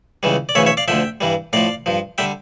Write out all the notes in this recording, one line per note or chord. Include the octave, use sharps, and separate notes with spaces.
C#2 C#3 E3 G3
D5
D2 C#3 E3 C#5 E5
C#5 E5
D5 F5
D2 D3 F3 E5 G5
G2 E3 G3
A2 F3 D5 F5
G2 F3
D3 G3 E5 G5